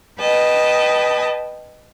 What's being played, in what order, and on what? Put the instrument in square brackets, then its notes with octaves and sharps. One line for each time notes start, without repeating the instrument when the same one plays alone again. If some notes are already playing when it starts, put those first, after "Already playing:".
[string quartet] B4 D#5 G5 A5